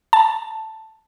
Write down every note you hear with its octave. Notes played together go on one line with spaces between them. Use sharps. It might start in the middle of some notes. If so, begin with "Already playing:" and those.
A5